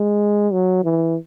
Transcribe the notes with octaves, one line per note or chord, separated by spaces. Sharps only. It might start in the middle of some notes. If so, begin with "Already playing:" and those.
Already playing: G#3
F#3
E3